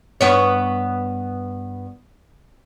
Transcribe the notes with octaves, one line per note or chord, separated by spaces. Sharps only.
G2 B3 C#5